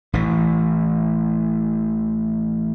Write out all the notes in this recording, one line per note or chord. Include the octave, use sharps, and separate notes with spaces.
A1 E3